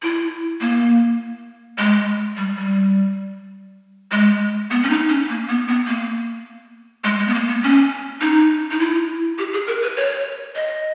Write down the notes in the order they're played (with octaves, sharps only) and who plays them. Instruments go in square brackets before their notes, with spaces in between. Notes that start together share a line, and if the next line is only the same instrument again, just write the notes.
[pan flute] E4
A#3
G#3
G3
G3
G#3
B3
C#4
D#4
C#4
A#3
B3
B3
A#3
G#3
G#3
B3
A#3
B3
C#4
D#4
D#4
E4
G4
G#4
A#4
B4
C#5
D#5